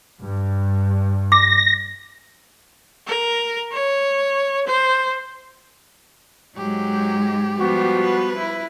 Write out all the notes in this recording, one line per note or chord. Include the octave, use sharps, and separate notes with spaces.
G2
D6 A#6
A#4
C#5
C5
G#2 F#3 G#3 G4
F3 G3 B3 F#4
B4
E4